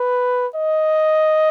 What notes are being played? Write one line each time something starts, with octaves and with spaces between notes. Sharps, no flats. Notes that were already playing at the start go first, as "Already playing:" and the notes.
Already playing: B4
D#5